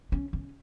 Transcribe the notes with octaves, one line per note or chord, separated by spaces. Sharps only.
C#4
C#4